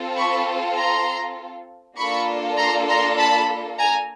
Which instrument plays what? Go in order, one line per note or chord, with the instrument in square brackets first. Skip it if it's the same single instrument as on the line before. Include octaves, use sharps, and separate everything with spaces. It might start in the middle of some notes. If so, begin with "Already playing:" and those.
Already playing: [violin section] C4 F4 A4
B5 C#6
A#5 C6
A#3 D4 F4 A4 B5 C#6
A#5 C6
A#5 C6
A5 B5
G#5 A#5